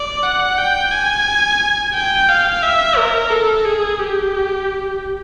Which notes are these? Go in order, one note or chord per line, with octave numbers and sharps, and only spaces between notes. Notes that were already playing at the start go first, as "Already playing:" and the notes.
Already playing: D5
F#5
G5
G#5
G5
F5
E5
A#4
A4
G#4
G4